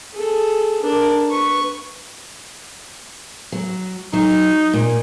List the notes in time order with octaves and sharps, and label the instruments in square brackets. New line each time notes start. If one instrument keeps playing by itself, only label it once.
[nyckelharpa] G#4 A4
D4 A#4
B4 C#6
[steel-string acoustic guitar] F#3
[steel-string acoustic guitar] F#3 [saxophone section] D#4
[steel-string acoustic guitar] A#2